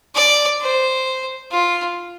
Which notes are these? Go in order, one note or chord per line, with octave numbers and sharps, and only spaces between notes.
D5
C5
F4